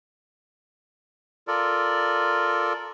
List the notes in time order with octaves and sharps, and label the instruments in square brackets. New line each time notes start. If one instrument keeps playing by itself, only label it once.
[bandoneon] F4 A4 A#4 D5